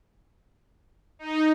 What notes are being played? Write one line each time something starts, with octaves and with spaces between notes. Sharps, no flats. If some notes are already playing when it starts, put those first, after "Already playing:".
D#4